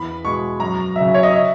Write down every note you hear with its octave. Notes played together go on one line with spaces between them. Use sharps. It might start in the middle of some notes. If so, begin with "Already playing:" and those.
Already playing: E2 B5
B2 G#3 C#6
F#2 A#5
C#3 F#3 E5
C#5
D#5
E5